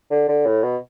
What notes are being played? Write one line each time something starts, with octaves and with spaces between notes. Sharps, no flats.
D3
D3
A2
B2